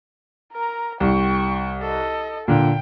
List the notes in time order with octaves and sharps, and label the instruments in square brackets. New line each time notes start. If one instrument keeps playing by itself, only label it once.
[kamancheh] A#4 A#5
[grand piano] C2 [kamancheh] G5 C#6
[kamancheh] A4 D#5
[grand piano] A#2 D3 [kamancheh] G5